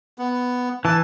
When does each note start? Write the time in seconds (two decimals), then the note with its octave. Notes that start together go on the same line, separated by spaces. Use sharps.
0.18 B3
0.85 E3 A5